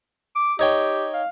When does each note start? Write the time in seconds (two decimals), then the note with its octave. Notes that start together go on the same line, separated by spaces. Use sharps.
0.35 D6
0.59 D#4 G4 C#5 G5
1.13 F5